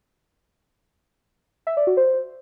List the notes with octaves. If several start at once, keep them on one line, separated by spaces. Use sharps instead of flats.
E5
D5
F#4
C5